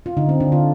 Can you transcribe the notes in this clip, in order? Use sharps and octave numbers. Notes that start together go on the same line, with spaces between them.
F4
D3 D#4
C4
D3 D4
F4